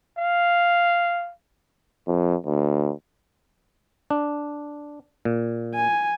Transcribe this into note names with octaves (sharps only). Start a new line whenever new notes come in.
F5
F2
D2
D4
A#2
G#5